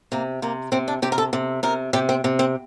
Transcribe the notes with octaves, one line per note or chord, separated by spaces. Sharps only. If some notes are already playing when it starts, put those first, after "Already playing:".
C3 A#3
C3 A#3
C3 C4
D4
C3 G4
A#4
A4
C3
C3 A#4
C3 G4
C4
C3
C4